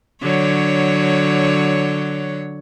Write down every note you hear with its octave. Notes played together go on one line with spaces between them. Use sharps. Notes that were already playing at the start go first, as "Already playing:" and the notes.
D3 F#3 C#5